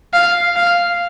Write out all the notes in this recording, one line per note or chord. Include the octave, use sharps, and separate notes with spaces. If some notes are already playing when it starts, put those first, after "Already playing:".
F5
F5